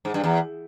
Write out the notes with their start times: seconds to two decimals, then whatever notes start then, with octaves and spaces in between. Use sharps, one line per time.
0.05 G#2
0.14 G2
0.24 E2